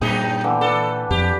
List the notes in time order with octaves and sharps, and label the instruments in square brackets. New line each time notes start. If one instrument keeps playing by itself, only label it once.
[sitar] F#2 D#4 G#4 [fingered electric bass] A#2 [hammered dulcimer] G5
[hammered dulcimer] D3 E3
[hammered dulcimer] D4 B4 [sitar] A4
[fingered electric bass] F2 F3 [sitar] G4